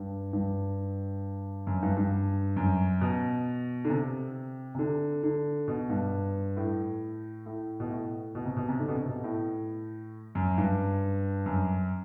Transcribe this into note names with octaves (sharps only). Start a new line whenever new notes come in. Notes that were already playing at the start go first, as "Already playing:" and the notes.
Already playing: G2
G2
F#2
G2
G2
F#2
B2
D3
C3
C3
D3
D3
B2
G2
A2
A2
B2
A2
B2
C3
B2
C3
D3
B2
C3
B2
A2
F#2
G2
F#2